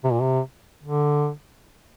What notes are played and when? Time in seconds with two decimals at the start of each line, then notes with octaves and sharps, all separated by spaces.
0.04 C3
0.12 A#2
0.22 C3
0.83 D3